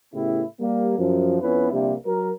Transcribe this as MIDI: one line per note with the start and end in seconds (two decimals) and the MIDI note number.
0.14 0.43 45
0.14 0.43 49
0.14 0.43 59
0.14 0.43 64
0.14 0.43 67
0.60 0.95 55
0.60 0.95 58
0.99 1.37 42
0.99 1.37 53
1.41 1.68 41
1.41 1.68 59
1.41 1.68 61
1.41 1.68 64
1.41 1.68 71
1.72 1.94 34
1.72 1.94 48
1.72 1.94 55
1.72 1.94 58
1.72 1.94 62
2.06 2.30 54
2.06 2.30 70